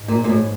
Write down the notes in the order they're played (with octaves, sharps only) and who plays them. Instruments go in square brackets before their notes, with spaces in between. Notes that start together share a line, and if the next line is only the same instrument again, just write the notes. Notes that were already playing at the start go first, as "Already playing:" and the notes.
Already playing: [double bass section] G#2 F3 G#3
[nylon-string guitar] A#2
A#2
A2